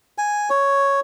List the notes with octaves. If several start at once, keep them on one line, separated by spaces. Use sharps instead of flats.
G#5
C#5